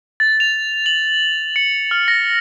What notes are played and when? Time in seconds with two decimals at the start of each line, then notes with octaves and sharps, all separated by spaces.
0.20 A6
0.40 F7
0.86 F#7
1.56 C#7
1.91 F6
2.08 A#6